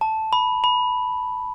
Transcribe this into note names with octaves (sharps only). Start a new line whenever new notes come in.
A5
B5
B5